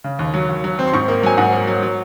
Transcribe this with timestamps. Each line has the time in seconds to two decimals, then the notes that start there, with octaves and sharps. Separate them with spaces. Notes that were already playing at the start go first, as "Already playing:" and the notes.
0.04 C#3
0.19 D#2
0.34 F#3
0.49 D#2
0.64 F#3
0.79 C4
0.88 C6
0.93 G#2 C#6
1.08 A#3
1.23 F#3 G#5
1.37 G#2 F#5
1.53 A#3
1.67 F#3
1.83 F#3